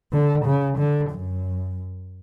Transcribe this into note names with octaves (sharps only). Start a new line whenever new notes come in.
D3
C#3
D3
F#2